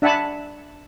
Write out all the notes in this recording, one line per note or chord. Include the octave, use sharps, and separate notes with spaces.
D4 E5 F#5 G#5 A5 B5